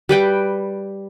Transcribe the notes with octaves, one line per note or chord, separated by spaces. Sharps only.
G3 B4 G5